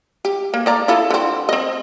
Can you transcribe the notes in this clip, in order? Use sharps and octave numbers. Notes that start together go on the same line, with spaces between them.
G4
A#3
A#3 D5 A#5
E4 F4 A4
D3 C4
C4 D#5